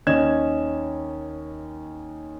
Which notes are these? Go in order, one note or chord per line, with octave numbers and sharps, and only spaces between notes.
D#2 C#4 D#5 G#6 E7